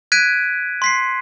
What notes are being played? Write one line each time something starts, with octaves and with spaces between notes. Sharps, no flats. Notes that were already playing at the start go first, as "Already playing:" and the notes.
F#6 G#6 B6 D7 D#7
C6 B6 C7